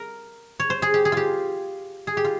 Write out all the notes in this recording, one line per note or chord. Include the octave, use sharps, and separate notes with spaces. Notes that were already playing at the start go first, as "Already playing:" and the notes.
Already playing: A#4
C#5
C5
G#4
G4
G#4
F4 G4
G#4
G4
F4